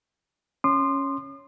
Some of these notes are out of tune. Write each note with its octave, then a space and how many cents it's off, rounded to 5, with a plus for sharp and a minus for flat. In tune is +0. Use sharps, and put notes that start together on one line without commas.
C#4 +0 C6 +0 D#6 -45